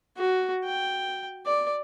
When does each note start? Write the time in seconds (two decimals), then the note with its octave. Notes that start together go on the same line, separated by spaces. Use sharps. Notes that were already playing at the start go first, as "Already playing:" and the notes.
0.18 F#4
0.65 G5
1.46 D5